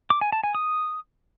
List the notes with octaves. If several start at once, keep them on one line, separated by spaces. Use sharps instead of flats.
D6
G#5
A5
G#5
D#6